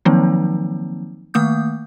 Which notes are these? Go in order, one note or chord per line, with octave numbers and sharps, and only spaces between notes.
D#3 F3 F#3 A#3 C4 D#4
D#3 A3 A#3 D#6 G6